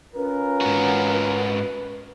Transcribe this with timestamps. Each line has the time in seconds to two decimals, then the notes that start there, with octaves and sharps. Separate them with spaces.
0.15 C#4 F4 A#4 B4
0.61 G#2 F#4